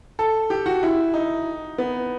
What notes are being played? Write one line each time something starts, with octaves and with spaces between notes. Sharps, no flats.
A4
G4
F#4
E4
D#4
B3